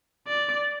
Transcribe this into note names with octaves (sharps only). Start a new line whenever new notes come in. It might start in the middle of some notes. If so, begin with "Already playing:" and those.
D5